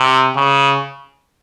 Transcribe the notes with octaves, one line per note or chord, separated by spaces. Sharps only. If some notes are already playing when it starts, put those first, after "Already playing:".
Already playing: C3
C#3